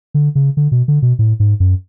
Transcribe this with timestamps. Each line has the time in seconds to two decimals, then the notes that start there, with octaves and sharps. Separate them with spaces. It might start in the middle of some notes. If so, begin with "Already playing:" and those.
0.14 D3
0.35 C#3
0.57 D3
0.72 B2
0.88 D3
1.02 B2
1.19 A2
1.40 G#2
1.60 F#2